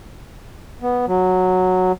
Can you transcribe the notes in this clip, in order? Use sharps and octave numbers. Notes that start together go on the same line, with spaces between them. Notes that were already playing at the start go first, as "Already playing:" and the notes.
B3
F#3